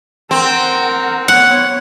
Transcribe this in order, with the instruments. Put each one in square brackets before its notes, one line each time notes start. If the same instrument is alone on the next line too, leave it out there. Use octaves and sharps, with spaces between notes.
[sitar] C4 [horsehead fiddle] A#4 F#5
[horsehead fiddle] B3 C#5 [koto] F#5